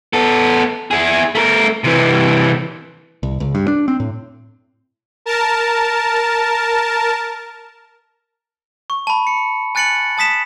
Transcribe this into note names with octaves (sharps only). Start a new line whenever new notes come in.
B3 A4
E4 G#4
A3 A#4
C3 E3
C2
C#2
G2
D4
C4
A2
A#4 A5
C#6
A5 B5
C#7
G#5 F#6 A6 C#7 D7 F#7
A5 D#6 B6 E7